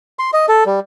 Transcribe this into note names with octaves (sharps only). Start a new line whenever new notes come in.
C6
D#5
A4
G3